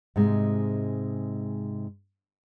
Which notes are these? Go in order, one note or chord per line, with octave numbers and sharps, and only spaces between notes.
G#2 C3 G#3